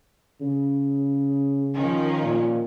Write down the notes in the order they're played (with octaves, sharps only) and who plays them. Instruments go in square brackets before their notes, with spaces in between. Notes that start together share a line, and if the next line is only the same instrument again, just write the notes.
[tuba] C#3
[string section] D#3 F3 C#4
[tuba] A#2